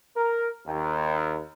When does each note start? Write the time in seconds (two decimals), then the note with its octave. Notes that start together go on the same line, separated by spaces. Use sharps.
0.16 A#4
0.67 D#2